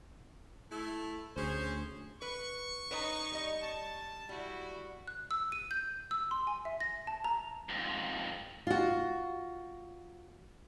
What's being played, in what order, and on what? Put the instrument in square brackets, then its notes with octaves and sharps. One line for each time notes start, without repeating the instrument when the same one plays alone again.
[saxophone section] A3 E4
[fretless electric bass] D2 [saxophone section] C#4 G#4 C5
[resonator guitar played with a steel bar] B4 [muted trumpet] C#6
[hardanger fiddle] D#4 [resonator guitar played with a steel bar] B4 C#5 D#5
[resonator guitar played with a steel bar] G3 D#5
[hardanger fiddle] A5
[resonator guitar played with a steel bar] G3 [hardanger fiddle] E4 F#4
[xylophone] F#6
E6
D#7
G6
E6
C6
G#5
E5
A#6
A5
A#5
[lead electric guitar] F2 G#2
[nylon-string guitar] F4 F#4